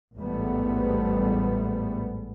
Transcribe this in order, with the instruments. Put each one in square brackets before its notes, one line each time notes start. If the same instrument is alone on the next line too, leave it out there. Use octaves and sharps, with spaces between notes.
[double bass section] A1 E2 G#2 G3 A3 B3